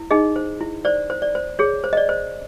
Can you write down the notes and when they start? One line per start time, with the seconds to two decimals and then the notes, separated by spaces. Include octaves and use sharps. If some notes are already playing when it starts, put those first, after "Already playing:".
Already playing: E4
0.11 D#4 G#4 D#5
0.36 C5
0.61 E4
0.85 C5 D5
1.10 C5
1.22 D5
1.35 C5
1.59 G#4 C#5
1.84 C5
1.93 D#5
1.97 D5
2.09 C5